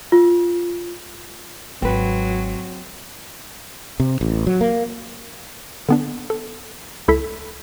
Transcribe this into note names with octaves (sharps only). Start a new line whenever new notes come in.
F4
G#1 F#3 C4 B4
C3
A1
F#3
A#3
D3 B3 D4
A4
C#2 E4 A4 B6